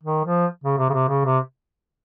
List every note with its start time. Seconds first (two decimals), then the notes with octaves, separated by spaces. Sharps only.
0.03 D#3
0.25 F3
0.64 C#3
0.78 C3
0.89 C#3
0.93 C3
1.09 C#3
1.25 C3